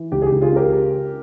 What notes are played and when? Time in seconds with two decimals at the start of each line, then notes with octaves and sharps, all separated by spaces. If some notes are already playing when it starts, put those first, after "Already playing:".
Already playing: E3
0.12 C#2 G4
0.22 G#4
0.26 G4
0.32 C#2
0.42 F4 G#4
0.52 C#3 G4 A#4